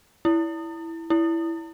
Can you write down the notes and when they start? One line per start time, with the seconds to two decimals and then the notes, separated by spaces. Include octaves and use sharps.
0.25 E4
1.10 E4